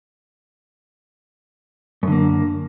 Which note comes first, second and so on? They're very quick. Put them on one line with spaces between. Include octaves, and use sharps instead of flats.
F#2 D3 A#3